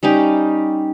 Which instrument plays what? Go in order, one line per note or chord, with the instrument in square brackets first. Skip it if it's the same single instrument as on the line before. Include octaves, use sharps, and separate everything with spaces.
[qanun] G3 C#4 D#4 G4